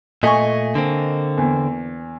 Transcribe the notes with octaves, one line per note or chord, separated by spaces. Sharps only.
A#2 A3 D#5 G#5 C#6
D3 A#3 C4
E2